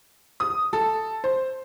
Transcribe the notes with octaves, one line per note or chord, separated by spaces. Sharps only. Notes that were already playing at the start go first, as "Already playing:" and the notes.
D#6
A4
C5